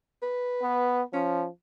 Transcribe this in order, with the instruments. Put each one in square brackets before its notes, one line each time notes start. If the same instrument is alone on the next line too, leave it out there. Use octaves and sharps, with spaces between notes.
[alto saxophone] B4
[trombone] B3
[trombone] F3 [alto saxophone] C#4